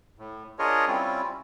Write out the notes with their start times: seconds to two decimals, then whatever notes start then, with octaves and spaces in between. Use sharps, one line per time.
0.18 A2
0.59 D4 F4 G#4 A#4 C#5 D#5
0.88 G3 C4 C#4 E4 F4